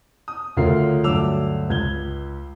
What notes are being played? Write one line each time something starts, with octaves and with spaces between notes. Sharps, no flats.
D#6
D2 C#3 F4 A#4 C#5 C7
D2 G2 F#3 D6 E6 F7
C#2 G#6 G7